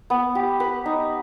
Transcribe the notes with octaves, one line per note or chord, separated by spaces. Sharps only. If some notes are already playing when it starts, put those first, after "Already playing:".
B3
G4
B4
D#4